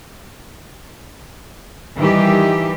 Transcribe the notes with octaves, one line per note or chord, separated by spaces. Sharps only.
D#3 E3 G3 G4